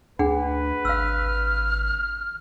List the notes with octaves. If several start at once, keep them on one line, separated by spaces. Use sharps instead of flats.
D2 D4 G#4 B4 F#5
G#1 F5 E6 F6